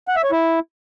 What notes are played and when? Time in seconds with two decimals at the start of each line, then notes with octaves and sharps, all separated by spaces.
0.08 F#5
0.16 E5
0.24 C#5
0.32 E4